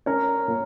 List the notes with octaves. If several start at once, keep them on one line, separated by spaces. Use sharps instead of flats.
C#4 A#4 C#5
A#2